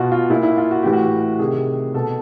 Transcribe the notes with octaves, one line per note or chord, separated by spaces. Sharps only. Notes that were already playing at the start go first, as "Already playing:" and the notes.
Already playing: B2 F4 F#4
F4
A#2 E4
E4
F4
F#4
A2 E3 G4
F#4
C3 D#3 G#4
B2 A4